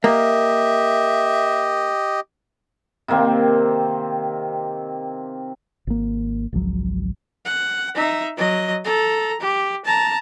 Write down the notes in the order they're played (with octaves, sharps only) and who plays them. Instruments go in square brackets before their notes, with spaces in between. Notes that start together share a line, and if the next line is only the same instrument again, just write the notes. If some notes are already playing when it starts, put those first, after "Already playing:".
[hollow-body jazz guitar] A#3 [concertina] G4 D#5 [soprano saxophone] E5
[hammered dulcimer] C3 D#3 A#3 C4
[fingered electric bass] G#1 A#3
G#1 C#2 F3 F#3
[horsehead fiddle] F#5
D#4 E5
F#3 D#5
A4 A#5
G4
A5 A#5